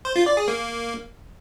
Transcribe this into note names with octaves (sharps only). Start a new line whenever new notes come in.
C5
F4
D5
G#4
A#3